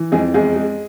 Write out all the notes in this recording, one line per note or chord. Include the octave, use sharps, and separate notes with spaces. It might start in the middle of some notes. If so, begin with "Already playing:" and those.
Already playing: E3
F2 G#3 G#4
E2 G#3 G#4
G#3